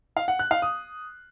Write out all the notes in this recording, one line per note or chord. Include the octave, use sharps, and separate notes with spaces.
F5
F#5
F#6
F5
D#6